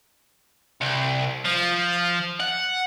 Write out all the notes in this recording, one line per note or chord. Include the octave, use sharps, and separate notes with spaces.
C2
F3
F#5